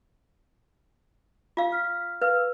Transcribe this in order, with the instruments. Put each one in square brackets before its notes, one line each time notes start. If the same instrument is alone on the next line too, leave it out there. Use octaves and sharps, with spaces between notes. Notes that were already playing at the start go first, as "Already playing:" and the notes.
[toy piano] F4 F5
[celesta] F6 B6
[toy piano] B4 [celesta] F5 E6